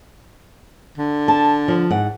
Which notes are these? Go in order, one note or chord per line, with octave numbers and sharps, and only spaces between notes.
D3
A5
F3
G#2 F#5